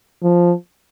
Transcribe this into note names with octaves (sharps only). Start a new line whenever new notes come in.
F3